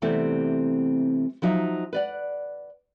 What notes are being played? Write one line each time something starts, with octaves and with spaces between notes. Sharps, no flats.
C3 E3 G3 A3 B3 C4
F3 F#3 D#4 E5
B4 D5 F#5